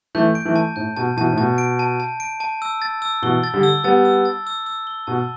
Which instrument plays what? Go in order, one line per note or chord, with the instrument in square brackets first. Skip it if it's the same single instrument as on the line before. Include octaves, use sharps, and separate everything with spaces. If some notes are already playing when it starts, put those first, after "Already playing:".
[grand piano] E3 A3 [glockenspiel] G6
[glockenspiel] D7
[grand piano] E3 A3
[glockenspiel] A5
[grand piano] A2 [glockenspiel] G6
[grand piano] B2 [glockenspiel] A5
[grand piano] B2 E3 [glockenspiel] A5
[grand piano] A2
[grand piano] B2 [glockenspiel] A5
[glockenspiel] D7
A5
A5
D7
A5
E6
A6
E6
[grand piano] B2 E3 [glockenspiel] G7
[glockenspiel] A6
[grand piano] D3 G3
[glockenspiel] E6
[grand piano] G3 B3 [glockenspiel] A6
[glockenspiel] E6
A6
E6
E6
G7
[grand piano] B2 [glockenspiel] A5